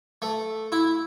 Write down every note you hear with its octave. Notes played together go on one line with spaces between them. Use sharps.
A3
E4